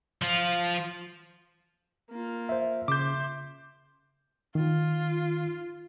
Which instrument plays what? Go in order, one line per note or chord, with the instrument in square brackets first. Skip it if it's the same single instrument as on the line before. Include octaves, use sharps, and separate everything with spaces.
[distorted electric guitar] F3 F4
[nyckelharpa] A#3 F4
[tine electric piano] C5 E5
[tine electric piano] C#3 [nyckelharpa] E5 C6 [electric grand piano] D6 G6
[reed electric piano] D#3 [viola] F4